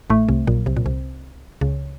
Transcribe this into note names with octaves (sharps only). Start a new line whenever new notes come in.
A1 A2 A3
C2 C3
A#1 A#2 F#3
C2 C3
A#2
C2 C3
C#2 C#3